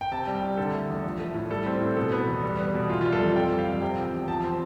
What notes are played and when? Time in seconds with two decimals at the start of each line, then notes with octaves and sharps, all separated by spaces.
0.01 G5
0.11 C3 A5
0.27 G3
0.35 G5
0.42 C2
0.57 D3 A4
0.74 A3
0.89 E2
1.04 F3
1.20 A3
1.34 A2
1.50 G3 A4
1.66 C4
1.81 A2
1.97 B2 A4
2.12 B3
2.27 E2
2.43 G3
2.59 B3
2.74 B2
2.89 E3 F4
3.01 G3 F4
3.12 A4
3.20 F2
3.36 C3 G5
3.51 G3
3.59 F5
3.67 F2
3.81 C3 G5
3.97 F3
4.04 G5
4.13 E2
4.28 F3 A5
4.44 C4